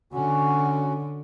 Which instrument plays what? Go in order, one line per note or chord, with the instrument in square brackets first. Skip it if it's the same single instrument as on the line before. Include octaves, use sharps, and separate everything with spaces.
[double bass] D3 [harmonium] C#4 F#4